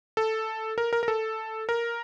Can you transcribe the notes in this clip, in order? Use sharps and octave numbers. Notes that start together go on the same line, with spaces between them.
A4
A#4
A#4
A#4
A4
A#4